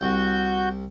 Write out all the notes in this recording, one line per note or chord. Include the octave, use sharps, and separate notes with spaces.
C2 F#4 G6